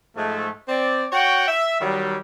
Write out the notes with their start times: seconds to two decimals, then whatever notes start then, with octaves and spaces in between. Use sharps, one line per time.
0.17 G#2 F3 G#3 A3
0.69 C4 D5
1.12 F#4 C#5 F#5 G5
1.48 E5
1.81 D#3 F#3 G3